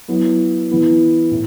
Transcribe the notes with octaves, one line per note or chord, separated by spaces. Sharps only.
F#3 B3 E4
E3 B3 E4
A2